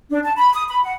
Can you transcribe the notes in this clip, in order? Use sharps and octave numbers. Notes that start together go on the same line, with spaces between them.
D4
A5
B5
D#6
B5
F#5